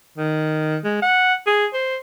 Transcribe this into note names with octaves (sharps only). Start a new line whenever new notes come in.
D#3
G#3
F#5
G#4
C5